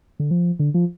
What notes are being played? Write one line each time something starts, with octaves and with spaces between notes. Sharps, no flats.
D3
F3
D3
F3